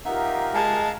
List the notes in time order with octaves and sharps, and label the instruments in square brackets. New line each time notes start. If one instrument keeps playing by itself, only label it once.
[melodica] B3 D#4 E5 [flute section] F4 G4 A#4
[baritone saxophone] G#3 [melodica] F5 A#5 [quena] A5